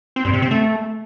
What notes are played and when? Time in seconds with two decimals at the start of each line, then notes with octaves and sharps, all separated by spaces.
0.16 C4
0.25 G2
0.34 C3
0.42 C4
0.51 A3